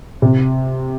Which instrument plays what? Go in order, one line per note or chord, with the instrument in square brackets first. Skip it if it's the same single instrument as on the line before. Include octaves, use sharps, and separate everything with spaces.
[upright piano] C3